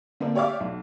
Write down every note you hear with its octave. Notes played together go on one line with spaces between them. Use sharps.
D3 A#3 C4 D4
G4 C#5 D5 E5 F5 D6
B1